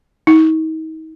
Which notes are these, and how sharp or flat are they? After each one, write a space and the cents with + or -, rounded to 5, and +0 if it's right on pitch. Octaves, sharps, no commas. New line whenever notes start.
D#4 +40